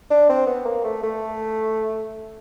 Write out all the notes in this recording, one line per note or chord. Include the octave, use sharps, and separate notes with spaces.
D4
C4
B3
A#3
A3
A3